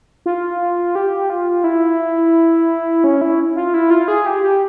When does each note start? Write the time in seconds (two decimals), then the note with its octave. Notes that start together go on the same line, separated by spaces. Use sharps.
0.26 F4
0.95 G4
1.30 F4
1.64 E4
3.04 C#4
3.21 E4
3.56 F4
3.74 E4
3.90 F4
4.08 G#4
4.26 G4
4.43 G4